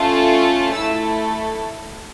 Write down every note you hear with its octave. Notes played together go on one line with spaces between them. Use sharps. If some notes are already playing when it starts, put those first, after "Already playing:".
Already playing: A3 C#4 F4 A4
A3 E4 A4 E6